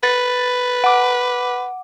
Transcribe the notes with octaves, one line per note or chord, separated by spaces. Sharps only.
B4 A6
F#5 D6